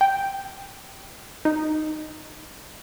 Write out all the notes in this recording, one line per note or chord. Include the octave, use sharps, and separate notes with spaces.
G5
D#4